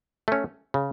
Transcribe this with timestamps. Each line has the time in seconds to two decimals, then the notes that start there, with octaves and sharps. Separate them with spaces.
0.28 A3 C#4
0.74 C#3